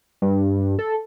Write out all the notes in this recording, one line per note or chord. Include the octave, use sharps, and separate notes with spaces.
G2
A4